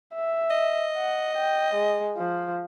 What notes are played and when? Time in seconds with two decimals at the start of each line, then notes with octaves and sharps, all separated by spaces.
0.15 E5
0.50 D#5
0.97 F#5
1.37 G5
1.74 G#3
2.17 F3